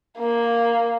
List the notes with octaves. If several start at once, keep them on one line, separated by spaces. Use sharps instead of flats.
A#3